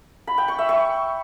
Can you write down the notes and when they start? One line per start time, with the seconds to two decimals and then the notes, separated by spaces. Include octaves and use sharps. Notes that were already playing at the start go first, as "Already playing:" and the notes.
0.27 B5
0.38 G5
0.48 C#6
0.58 E5
0.69 C#6